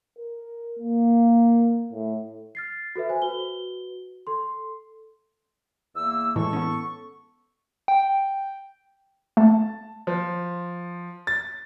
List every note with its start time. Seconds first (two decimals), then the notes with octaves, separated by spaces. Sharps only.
0.19 A#4
0.79 A#3
1.92 A2
2.55 F6 A6 C7
2.96 F#4 A4 B4 E5
3.09 C5 G#5
3.22 F#4 B4 G7
4.27 A4 C6
5.95 E2 A#3 E6
6.36 A2 E3 G#3 A4 C#6
6.53 B3 C#4
7.88 G5
9.37 A3 A5
10.07 F3
11.27 A6